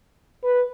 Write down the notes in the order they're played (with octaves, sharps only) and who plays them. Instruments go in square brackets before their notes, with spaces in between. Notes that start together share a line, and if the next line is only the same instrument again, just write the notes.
[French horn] B4